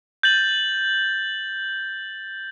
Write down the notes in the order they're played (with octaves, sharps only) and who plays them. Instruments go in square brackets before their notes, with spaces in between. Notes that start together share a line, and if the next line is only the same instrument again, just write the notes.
[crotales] G6 A6 F#7